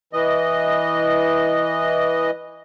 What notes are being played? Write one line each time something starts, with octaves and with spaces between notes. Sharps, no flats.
E3 D#5